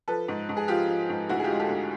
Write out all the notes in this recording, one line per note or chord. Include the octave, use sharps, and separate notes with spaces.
F3 A4 B4
G#2
G#2
G#4
F3 F4 G4
F3
G#2
D2 E4 F#4
G#4
F4 G4
G#3
G4 A4
D2